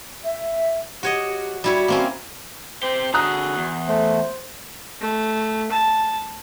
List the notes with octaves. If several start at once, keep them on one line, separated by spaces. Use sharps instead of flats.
E5
F#4 G4 C#5 D#5
G3 E4 F#4 C#5
A#3 C4 C#4
C4 G4 C5
D3 F#4 G#4 A#5 D#6 F#6
E2
A3 C5
A3
A5